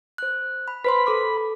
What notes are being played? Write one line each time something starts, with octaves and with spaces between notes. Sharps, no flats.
C5 F#6
B5
B4 C5 B5 C6
A4 D6